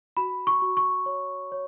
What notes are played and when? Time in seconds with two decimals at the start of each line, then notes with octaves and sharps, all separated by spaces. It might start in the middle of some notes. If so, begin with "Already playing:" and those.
0.17 F#4 B5
0.47 C#6
0.62 F#4
0.77 C#6
1.06 C#5
1.52 C#5